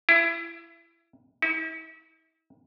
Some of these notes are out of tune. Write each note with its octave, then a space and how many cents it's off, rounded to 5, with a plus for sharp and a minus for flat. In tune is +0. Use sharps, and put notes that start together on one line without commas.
E4 +25
E4 -40